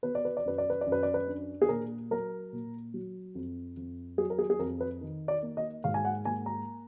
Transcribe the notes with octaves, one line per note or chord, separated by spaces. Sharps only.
B3 B4
D5
B4
D5
F#2 B4
D5
B4
D5
F#2
B4
D5
B4
D4
G#4
A#2 A#4
F#3 A#4
A#2
F#3
F2
F2
F#3 G#4
A#4
G#4
G#4
F2 A#4
B4
D#3
D5
A#3
D#5
G#2 F5
G#5
F#5
A#3 G#5
A#5